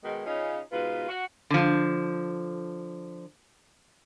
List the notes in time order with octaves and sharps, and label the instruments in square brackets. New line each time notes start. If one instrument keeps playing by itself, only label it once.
[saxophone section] B2 D#3 G#3
C#3 C#4 D#4 F4 F5
G#2 B2 F4 B4
F#4
[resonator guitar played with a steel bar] D3 F3